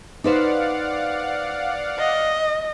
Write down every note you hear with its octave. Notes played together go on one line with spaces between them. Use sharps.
D#4 B4 C5 D5 F5 F#5
D#5